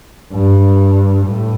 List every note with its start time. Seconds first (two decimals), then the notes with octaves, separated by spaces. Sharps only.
0.32 G2
1.26 A2